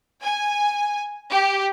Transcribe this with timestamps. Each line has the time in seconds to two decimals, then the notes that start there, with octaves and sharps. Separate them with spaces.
0.23 G#5
1.29 G4